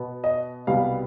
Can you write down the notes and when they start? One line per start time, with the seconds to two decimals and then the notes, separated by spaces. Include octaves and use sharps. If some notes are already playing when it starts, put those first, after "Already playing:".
Already playing: B2 B3
0.24 D#5
0.67 C2 B2 G3 B3 F5